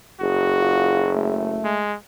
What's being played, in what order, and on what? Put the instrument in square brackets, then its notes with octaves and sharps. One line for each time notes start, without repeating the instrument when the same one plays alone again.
[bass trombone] F#1 [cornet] F#4 [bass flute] G#4
[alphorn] F4
A3
[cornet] G#3